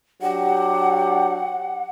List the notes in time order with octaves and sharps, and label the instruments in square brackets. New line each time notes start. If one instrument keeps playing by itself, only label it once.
[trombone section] F#3 D4 G4 [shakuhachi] F#5